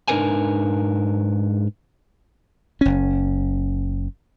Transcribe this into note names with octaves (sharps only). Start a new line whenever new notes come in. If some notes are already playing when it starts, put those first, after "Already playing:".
G#2 D4 D#4 A#4 B4 G#5
F#1 C#4